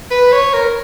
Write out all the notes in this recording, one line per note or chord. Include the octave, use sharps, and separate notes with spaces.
B4
C#5
A#4